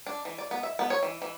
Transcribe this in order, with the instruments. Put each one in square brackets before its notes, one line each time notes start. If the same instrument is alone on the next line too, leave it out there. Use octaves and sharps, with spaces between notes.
[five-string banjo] D4
E3
D5
B3
E5
B3
C#5
E3
E3